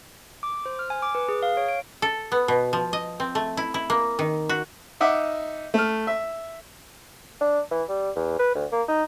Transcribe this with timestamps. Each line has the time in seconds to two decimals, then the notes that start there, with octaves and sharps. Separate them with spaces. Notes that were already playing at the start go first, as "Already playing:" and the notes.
0.43 D6
0.66 C5
0.79 F6
0.90 G#5
1.02 D6
1.15 B4
1.29 G#4
1.43 F5
1.57 C#5
1.69 D7
2.02 A4
2.32 B3
2.48 B2
2.73 F3
2.93 D#5
3.20 C4
3.35 A3
3.57 E4
3.74 E4
3.90 A#3
4.19 D#3
4.49 F#4
5.00 D#4 D#5 E5 F#5 D6
5.74 A3 F6
6.07 E5
7.41 D4
7.71 E3
7.89 G3
8.16 E2
8.39 B4
8.55 D2
8.72 A#3
8.88 D#4